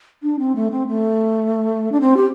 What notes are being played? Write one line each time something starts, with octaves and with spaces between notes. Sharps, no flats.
D4
C4
A3
C4
A3
D4
C4
G4